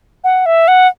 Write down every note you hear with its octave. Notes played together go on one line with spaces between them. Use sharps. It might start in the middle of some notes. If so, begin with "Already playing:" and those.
F#5
E5
F#5